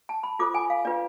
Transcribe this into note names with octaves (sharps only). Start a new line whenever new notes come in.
A5
B5
F4 A4 C5 D6
G#5
F5
D4 F4 B4 D5